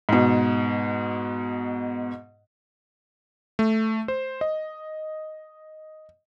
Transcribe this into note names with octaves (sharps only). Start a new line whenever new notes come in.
G#2 B2
A3
C5
D#5